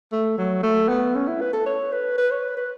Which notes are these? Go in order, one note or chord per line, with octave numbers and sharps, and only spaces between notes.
A3
F#3
A3
B3
C#4
E4
B4
A4
C#5
B4
B4
C#5
B4
B4